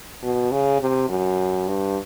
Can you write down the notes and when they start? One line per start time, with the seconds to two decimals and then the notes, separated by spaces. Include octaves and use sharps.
0.22 B2
0.52 C#3
0.81 C3
1.09 F#2
1.68 G2